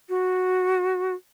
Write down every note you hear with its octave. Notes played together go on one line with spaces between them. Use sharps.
F#4